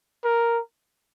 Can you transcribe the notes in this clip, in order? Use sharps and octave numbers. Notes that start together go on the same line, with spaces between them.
A#4